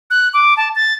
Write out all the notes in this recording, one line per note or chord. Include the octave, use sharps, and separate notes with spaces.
F#6
D6
A5
A6